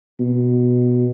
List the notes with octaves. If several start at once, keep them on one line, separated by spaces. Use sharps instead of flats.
B2